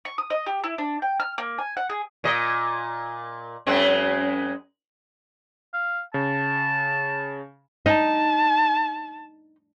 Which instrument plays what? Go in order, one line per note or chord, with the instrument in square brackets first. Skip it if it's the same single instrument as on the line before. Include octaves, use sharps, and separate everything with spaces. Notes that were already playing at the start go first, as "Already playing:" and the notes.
[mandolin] C#6
D#6
D#5
G4
E4
D4
G5
F6
A#3
G#5
F#5
G#4
[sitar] A#2 D#5
F#2 G#3 C4
[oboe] F5
[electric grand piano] C#3 [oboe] A5
[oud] D#4 [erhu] A5